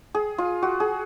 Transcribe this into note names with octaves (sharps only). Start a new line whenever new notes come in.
G#4
F4
F#4
G#4